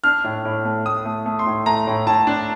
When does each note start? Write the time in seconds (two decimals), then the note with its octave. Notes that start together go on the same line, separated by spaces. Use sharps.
0.04 D4 F6
0.24 A2
0.45 A2
0.65 A3
0.85 A2 D#6
1.05 A3
1.26 A3
1.39 C6
1.46 A2
1.66 A3 A#5
1.87 A2
2.07 A2 A5
2.27 D4